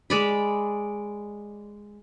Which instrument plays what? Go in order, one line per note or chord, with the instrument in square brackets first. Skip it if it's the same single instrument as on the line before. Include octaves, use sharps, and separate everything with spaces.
[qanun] G#3 D5 B5